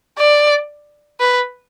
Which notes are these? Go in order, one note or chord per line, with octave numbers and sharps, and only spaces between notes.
D5
B4